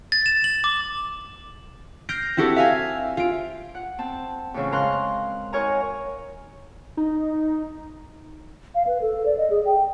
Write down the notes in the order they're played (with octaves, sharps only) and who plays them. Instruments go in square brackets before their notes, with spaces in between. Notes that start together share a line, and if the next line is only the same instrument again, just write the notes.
[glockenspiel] A6
E7
F#7
D6
[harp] F6 G6 A#6 C7 D7
C4 E4 F#4 G4 A4
E5 F5 G#5
F4 D7
F#5
C4 A5
F2 A2 C#3 E3
G#3 A#4 F5 A#5 C6 F#6
D#4 F#4 A#4 C#5 G#5 A#5
[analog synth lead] D#4
[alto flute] F5
B4
A4
D5
D#5
G#4
G5